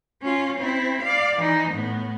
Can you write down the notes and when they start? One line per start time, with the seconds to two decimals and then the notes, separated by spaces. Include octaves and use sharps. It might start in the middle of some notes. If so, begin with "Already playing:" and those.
0.23 C#4 F4
0.59 C4 E4
1.03 D5 F5
1.37 E3 D#4
1.72 A2 B3